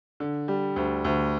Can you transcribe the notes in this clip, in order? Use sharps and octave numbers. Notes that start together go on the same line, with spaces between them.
D3
G3
D2
D2